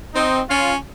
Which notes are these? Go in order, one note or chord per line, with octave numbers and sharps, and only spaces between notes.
C4 D#4
C#4 F4